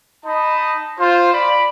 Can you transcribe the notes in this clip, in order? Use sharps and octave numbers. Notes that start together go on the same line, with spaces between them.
D#4 D#5 A5 B5
F4 C5
D5 B5